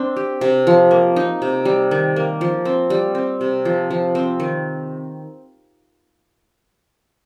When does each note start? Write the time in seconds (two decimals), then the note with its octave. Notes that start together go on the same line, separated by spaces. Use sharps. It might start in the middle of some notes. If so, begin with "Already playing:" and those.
Already playing: C4 D4
0.16 G4
0.41 C3
0.67 F3
0.91 A#3
1.16 D#4
1.42 C3
1.65 G3
1.91 D#3
2.16 A#3
2.41 F3
2.65 C4
2.90 G3
3.15 C4
3.41 C3
3.65 F3
3.91 F3
4.15 C4
4.40 D#3